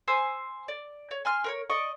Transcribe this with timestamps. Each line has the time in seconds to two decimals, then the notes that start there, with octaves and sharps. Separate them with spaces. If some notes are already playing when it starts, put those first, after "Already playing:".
0.08 C5 G#5 E6
0.68 D5
1.11 C#5
1.25 G#5 C6 F6
1.44 A#4 C5 C#5
1.70 D5 D#5 C#6